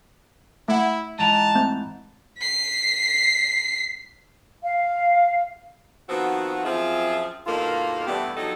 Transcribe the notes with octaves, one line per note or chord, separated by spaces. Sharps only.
A3 E4 E5 F#5
G#2 E3 A5 A#5
A3 C4 G6
B6 C7
F5
D#3 F3 B3 C4 F#4
F#2 F3 C4 F4 G#4 E5
G2 B2 D#3 A#3 F4 A4
G2 E3 G3 A3 B3 G4
G2 F3 F#3 D#4 A4 D#5